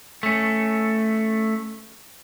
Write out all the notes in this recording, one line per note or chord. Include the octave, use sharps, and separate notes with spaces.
A3 C#4